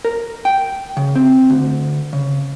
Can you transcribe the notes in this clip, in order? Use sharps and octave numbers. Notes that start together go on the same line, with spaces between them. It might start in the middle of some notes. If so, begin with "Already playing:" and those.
A#4
G5
C#3
C4
D2
C#3